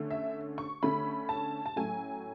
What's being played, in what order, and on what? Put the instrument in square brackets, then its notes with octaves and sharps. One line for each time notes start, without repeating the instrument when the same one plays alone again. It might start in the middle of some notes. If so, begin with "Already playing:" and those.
Already playing: [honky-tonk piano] D3 A3 C#4
E5
C#6
D3 A3 C#4 B5
A5
A5
A2 F#3 A3 C#4 G#5